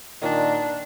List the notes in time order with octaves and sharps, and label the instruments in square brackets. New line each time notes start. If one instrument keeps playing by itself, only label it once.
[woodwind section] A#2 D#3 [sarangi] D4